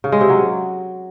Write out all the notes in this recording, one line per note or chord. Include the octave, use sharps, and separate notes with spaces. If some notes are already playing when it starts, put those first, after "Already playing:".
C#3
G#3
C3
F#3